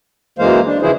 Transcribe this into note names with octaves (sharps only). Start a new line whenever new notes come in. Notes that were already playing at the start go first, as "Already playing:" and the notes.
F#2 E3 G#3 A#3 C5 F5
D4
C#3 E3 F3 E4 G#4 C5